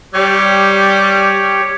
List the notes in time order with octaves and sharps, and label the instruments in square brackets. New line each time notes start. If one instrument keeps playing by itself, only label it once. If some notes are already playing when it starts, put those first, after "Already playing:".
[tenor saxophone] G3 [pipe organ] G4 C#5